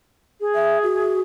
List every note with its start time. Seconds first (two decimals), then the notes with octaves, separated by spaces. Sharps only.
0.41 G#4
0.55 E5
0.83 F#4